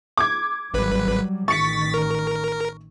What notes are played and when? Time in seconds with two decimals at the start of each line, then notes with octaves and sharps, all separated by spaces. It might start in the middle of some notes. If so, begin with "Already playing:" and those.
0.17 D6 G#6
0.74 G#1 F#3 G3 B4
1.48 A1 D#3 C#6 A6 B6 C#7
1.94 A#4